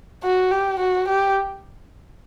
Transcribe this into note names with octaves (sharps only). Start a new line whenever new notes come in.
F#4
G4
F#4
G4